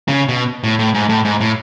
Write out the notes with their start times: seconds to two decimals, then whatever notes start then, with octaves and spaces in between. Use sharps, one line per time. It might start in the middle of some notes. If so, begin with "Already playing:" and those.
0.08 C#3
0.28 B2
0.64 A2
0.79 A2
0.94 G#2
1.09 A2
1.25 G#2
1.41 A2